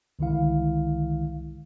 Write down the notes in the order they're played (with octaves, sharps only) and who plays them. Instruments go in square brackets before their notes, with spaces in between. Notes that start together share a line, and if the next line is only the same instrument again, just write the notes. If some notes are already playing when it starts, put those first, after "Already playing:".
[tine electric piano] C2 D3 D#3 G#3 E4 F5